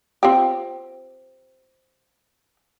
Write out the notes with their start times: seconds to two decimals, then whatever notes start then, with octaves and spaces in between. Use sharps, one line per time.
0.23 C4 F4 G4